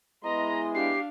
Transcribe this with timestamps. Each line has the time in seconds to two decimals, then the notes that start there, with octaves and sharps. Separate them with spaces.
0.24 G#3 B3 E4 D#5 A#5 C6
0.75 D4 G4 F5 C7